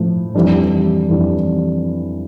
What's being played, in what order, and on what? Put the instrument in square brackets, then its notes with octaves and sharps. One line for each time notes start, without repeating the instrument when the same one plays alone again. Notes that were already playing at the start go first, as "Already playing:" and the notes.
Already playing: [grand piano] A2 F3 A3
F2 E3 G3 D4
F2 E3 G3 D4